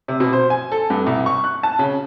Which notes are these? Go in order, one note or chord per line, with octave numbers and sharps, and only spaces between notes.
C3
B2
C5
G#5
A4
G2
C2
C#6
F#6
A5
C#3